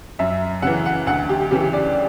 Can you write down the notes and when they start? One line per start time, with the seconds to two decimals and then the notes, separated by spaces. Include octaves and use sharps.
0.19 F#2 E5
0.62 C#3 E3 F#5
0.86 F#5
1.07 D2 F#5
1.29 G4
1.51 C#3 E3 G4
1.73 D5